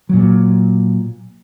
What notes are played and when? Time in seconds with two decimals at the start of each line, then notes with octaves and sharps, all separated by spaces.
0.09 A#2 F#3